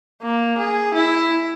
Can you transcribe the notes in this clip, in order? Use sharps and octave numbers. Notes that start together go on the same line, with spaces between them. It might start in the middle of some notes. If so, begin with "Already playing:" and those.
A#3
G#4
E4